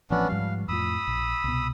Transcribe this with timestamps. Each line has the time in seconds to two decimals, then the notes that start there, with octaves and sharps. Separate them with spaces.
0.10 A1 F3 B3 C#4 D4
0.29 G#2 F3 G3 F5
0.68 F2 A2 F3 B5 D#6 E6
1.07 A#1
1.44 C2 B2